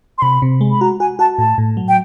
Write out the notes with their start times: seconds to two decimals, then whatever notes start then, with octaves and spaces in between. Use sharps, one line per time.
0.18 C6
0.22 C3 B5
0.42 C3
0.61 G#3
0.71 B5
0.81 F#4 A#5
1.00 F#4 G#5
1.19 F#4 A5
1.38 A2 A5
1.58 A2
1.77 F#3
1.88 G5